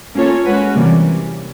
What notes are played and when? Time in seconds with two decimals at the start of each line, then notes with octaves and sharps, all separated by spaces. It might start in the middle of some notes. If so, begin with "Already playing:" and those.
0.15 A#3 C#4 F4 A4 C#5
0.45 G#3 C#4 F#4 B4
0.74 C3 E3 G3 A#3